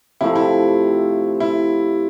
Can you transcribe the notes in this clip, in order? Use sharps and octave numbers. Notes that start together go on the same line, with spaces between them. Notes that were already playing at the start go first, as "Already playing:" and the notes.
C3 F3 A3 E4
E4
E4